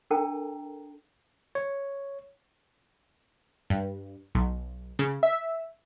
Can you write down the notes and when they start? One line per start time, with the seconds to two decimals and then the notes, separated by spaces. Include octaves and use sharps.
0.11 D4 A4 A#4 G5 A5 A#5
1.55 C#5
3.70 G2
4.35 B1
4.99 C#3
5.23 E5